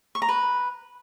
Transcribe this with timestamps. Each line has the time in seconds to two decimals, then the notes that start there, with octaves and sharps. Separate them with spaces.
0.15 C#6
0.22 A#5
0.29 B4